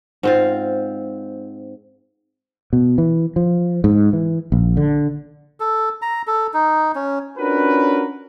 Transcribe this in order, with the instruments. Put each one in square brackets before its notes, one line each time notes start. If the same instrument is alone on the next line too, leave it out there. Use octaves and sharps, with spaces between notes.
[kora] G#2 C4 F4
[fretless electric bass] B2
E3
F3
G#2
E3
A#1
D3
[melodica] A4
A#5
A4
D#4
C#4
[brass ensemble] C#4 D4 F4 F#4 A#4 B4